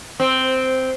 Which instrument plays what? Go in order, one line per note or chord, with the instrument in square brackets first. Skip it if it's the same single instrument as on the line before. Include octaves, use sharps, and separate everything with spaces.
[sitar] C4